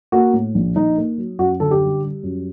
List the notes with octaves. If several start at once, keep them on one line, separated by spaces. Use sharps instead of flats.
A#3 F#4
A2
A#1
A#1 D#4
A#3
F#3
F#2 F#4
D3 A4
G4
G3
G3
F#2